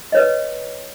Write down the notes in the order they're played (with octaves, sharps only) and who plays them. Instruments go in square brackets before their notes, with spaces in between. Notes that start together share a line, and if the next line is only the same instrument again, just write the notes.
[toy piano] B4 C#5 D#5